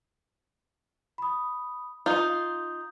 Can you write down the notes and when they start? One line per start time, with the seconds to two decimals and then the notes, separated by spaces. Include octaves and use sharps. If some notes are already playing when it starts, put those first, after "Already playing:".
1.18 B5 D#6
2.06 D#4 F4 D#6 G6